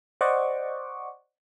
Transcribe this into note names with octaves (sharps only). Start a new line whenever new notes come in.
C5 D5 D#5 F#5 C#6 D6